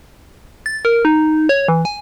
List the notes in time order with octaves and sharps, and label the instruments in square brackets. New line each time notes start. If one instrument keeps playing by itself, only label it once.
[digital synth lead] A6
A#4
D#4
C#5
E3
G#5